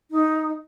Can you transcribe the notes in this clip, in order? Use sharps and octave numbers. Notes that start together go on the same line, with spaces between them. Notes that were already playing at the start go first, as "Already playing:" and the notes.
D#4